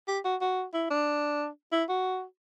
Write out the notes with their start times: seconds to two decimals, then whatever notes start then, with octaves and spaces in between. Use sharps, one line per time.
0.08 G4
0.25 F#4
0.41 F#4
0.74 E4
0.90 D4
1.72 E4
1.89 F#4